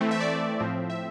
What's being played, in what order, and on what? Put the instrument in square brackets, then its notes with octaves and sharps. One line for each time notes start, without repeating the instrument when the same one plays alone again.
[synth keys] E3 A3 C4
E5
D5
E5
A2 F3 C4
E5